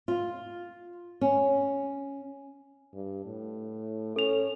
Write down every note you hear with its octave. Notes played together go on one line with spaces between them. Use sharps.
F4
C#4
G2
A2
C#4 A4 F7